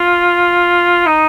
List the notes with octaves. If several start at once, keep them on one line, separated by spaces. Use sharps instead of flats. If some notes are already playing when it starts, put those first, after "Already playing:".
Already playing: F4
D#4